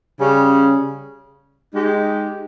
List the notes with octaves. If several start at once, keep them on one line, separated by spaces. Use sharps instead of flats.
C#3 G3 C#4
G#3 D#4 G4